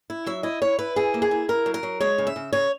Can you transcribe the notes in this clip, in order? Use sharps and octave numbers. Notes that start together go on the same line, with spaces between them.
E4
F#3 E5
E4 D#5
E4 C#5
E4 B4
E4 G#4
A#3
G#4
E4
E4 A#4
F#3
A#4
F#3
G#3 C#5
C#3
E5
C#3
C#3 C#5